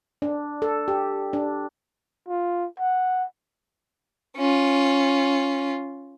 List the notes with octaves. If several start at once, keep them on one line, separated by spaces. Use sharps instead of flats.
D4
A4
G4
D4
F4
F#5
C#4 F4